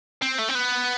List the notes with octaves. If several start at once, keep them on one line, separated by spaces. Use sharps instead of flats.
C4
A3
C4
B3